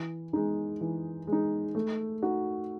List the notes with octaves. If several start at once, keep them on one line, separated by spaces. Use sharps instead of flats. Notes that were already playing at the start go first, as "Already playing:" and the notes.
Already playing: E3
G#3 D#4
E3
G#3
D#4
A3
D#4 F#4